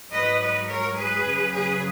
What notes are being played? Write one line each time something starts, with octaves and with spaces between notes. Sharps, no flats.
G#2 F#3 B4 D#5
B4 D#5
A#4 C#5
G#4 B4
F#2 C#3 F#3
G#4 B4